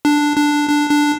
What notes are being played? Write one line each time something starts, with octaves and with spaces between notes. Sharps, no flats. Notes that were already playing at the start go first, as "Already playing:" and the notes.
D4
D4
D4
D4